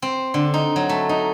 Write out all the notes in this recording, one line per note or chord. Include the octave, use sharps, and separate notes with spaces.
C4
D3
D#4
F#3
A3
D#4